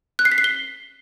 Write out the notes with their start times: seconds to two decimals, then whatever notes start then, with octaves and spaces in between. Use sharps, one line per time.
0.19 F#6
0.25 C7
0.32 B6
0.38 C7
0.44 G7